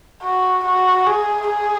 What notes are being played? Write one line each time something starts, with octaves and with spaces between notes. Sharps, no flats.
F#4
F#4
G#4
G#4